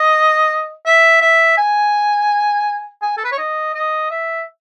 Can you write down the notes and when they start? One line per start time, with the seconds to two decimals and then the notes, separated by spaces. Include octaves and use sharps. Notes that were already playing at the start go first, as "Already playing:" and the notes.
Already playing: D#5
0.86 E5
1.22 E5
1.58 G#5
3.02 G#5
3.17 A4
3.24 B4
3.32 C#5
3.38 D#5
3.74 D#5
4.10 E5